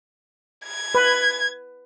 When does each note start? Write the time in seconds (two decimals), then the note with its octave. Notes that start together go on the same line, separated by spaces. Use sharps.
0.66 G#6
0.95 B4